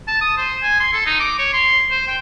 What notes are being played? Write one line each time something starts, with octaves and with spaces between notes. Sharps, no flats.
A5
D#6
C5
G#5
C6
A4
D#4
D6
C#5
C6
C5
G5